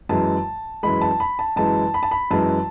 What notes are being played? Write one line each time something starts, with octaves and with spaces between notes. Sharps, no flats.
F#2 E3 G#3 A5
F#2 E3 G#3 B5
A5
B5
A5
F#2 E3 G#3 A5
B5
A5
B5
F#2 E3 G#3 A5